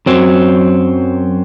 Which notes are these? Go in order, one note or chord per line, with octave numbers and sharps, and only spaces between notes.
F#2 F#3 C4